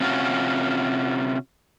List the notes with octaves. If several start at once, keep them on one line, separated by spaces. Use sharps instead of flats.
C3 C#4 F4 F#4